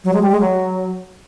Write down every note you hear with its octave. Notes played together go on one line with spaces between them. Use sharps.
F#3
G#3
G3
G#3
F#3